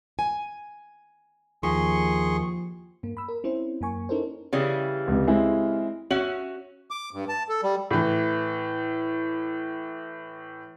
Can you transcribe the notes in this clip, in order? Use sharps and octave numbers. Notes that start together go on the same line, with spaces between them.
G#5
D#2 F3 G#4 C6 C#6
G2 A#3
B5 E6
A#4
C4 C#4 E4 C5
F#2 A#3 G#5 C#6
C#4 D#4 E4 A4 A#4 C5
C#3 E3 G3
C#2 C3
G#3 C4 E4
C#4 F#4 E5 F#7
D6
G2
A5
A4
G3
A2 E3